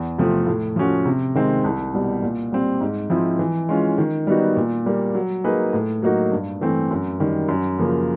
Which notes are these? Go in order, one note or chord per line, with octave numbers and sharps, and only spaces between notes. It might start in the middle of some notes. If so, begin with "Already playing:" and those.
Already playing: E2
C3 F3 A3 C4
A2
F3 A3 C#4 F#4
C3
D#3 G#3 C4
C2
B2 G3
A#2
G3 C4
G#2
F3 G#3 C4 E4
E3
G#3 C#4 F4
D#3
G3 B3 D#4 F#4
A#2
G3 A#3
F#3
A#3 D#4 G#4 B4
A2
F#3 A#3 D#4 F#4
G2
E3 A3 C4
F#2
D#3 G3
F#2
C#3 F3 A#3